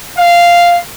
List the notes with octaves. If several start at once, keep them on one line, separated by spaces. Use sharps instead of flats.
F5